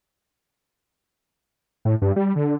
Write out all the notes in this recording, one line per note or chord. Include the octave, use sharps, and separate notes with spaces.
A2
G2
G3
D3